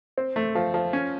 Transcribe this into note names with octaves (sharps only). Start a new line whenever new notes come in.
C4
A3
F3
F3
C#4